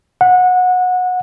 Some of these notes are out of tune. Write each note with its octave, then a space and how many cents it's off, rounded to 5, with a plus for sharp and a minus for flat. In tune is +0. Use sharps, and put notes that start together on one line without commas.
F#5 -20